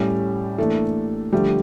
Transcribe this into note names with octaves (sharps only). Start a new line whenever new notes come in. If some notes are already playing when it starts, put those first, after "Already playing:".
Already playing: A2 G3 C#4 G4
E3 A3 A#3 D4 A4
D3 F3 G3 A3 G4